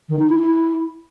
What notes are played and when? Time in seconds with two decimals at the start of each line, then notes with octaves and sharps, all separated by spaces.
0.09 D#3
0.19 D#4
0.29 E4
0.39 E4